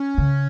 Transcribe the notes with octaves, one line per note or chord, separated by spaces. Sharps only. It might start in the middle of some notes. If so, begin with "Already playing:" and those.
Already playing: C#4
C#3